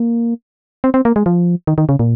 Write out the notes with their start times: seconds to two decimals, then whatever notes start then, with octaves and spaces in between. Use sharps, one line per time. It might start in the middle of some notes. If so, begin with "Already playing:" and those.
Already playing: A#3
0.84 C4
0.94 C4
1.05 A#3
1.16 G#3
1.26 F3
1.67 D#3
1.78 D#3
1.89 C#3
1.99 A#2